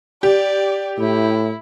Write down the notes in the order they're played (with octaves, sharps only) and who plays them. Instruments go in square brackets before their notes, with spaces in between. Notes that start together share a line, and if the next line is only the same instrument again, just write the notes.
[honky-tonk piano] G4 [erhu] D5
[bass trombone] A2 [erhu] E4